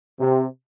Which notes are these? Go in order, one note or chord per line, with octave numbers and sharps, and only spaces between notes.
C3